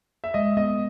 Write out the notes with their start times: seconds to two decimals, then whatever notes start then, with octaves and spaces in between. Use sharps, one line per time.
0.24 E5
0.34 G#3 D#5
0.57 B3 D#5